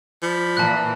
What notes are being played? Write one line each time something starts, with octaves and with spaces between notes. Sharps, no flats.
F3 D5 B5
A#2 E3 A5 F#6